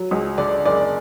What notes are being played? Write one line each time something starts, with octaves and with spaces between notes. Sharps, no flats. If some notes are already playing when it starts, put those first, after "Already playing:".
Already playing: F#3
C#2
D3 D5
F#1 D5